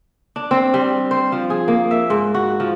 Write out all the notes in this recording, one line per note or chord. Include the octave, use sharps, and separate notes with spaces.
D4
C4
G3
C5
F3
G#4
A#3
E5
G#2
F#4
F3